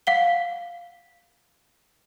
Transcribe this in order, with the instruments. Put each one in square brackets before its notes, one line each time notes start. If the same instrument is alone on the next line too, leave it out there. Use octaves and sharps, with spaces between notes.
[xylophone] F5 F#5 G7